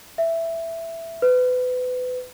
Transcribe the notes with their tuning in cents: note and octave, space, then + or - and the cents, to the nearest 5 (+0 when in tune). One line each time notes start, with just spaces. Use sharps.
E5 +5
B4 +30